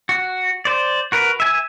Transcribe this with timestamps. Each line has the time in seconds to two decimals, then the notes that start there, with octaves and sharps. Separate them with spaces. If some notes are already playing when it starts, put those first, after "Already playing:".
0.09 F#4
0.65 C5 D5
1.12 F#4 A#4 B4
1.40 E5 G#5